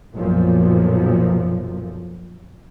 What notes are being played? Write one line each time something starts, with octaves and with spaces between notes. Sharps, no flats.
B1 F#2 A#2 F3